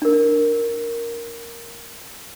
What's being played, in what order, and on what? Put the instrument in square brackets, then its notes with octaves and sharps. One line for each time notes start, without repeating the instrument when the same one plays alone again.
[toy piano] D4 A#4